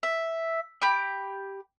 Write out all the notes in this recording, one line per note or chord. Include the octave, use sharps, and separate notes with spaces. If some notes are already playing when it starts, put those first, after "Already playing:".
E5
G4 B5 D6